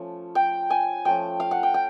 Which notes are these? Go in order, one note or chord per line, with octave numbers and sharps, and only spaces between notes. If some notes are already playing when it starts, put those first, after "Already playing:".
Already playing: F3 A3 C#4
G5
G#5
F3 A3 C#4 G5
F5
F#5
G5
G5